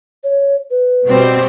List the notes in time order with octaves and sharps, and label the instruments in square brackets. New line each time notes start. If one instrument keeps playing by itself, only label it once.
[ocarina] C#5
B4
[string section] B2 G3 C4